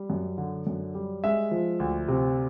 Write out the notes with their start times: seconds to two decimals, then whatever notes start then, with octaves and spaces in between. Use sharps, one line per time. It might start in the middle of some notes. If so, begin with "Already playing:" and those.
Already playing: G3
0.10 F#2
0.38 D3
0.67 F#2
0.95 G3
1.24 G#3 E5
1.51 F3
1.80 D2
2.08 C3